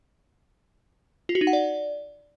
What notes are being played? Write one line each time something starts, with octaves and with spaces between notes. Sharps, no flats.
F4
F#4
D#4
F#5
D5